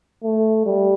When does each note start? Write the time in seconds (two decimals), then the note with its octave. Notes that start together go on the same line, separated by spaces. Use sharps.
0.24 A3
0.66 G3